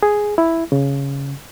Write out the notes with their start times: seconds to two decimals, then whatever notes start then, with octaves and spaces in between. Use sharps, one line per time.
0.03 G#4
0.38 E4
0.72 C#3